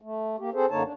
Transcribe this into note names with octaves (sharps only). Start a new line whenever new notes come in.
A3
A#3 G4
C4 G#4 A4 C5
F#2 D3 A#3 D#4 C#5 A5
D4